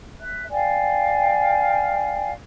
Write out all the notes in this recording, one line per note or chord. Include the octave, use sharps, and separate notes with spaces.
E5 F#6
D5 F5 G5 G#5